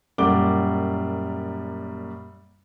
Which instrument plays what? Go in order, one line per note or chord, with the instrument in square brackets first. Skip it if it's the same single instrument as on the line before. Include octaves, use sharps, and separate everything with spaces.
[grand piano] F#2 A#2 G3 F#5 D6 G7